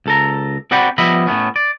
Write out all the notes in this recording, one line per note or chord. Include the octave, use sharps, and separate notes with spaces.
C#2 A4 A#5
C4 F#4 D5 F#5 G5 B5
F3 G3 B3 D#5 E5 B5
A2 A3 B3 C#4
D5